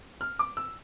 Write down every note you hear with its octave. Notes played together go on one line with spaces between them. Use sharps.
F6
D6
E6